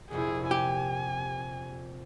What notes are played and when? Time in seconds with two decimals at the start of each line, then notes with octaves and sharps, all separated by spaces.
0.11 A#1 F2 C3 E4 G#4
0.51 G4 G#5